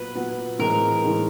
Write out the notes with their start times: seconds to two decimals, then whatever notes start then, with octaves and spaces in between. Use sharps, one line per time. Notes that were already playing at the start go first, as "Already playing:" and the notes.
Already playing: A#2 F#3 B3 B4
0.15 A#2 F#3 B3
0.59 A2 E3 G#3 C4 A#4
1.04 A2 E3 G#3 C4